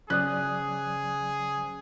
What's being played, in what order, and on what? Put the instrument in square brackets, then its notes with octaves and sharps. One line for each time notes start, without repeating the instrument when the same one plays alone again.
[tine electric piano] C#3 C#4 C5 [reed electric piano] F#3 D5 D#6 [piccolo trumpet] G#4 [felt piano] F#6